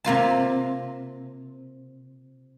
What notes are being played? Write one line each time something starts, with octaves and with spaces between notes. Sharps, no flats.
C3 A#3 F4 A5